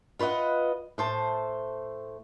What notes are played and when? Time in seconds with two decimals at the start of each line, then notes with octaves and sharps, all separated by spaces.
0.19 F4 B4 C5 D#5 F#5
0.98 A2 C5 A5